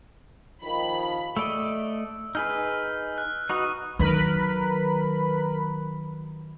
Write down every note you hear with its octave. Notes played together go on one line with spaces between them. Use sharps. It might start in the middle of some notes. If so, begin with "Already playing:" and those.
D#2 D#3 F3 B5
A3 D5 D#5 E6
D#4 G#4 B4 F6
F#6
D#4 F#4 B4 C#6 D#6
D#3 F#3 A#4 B4 B5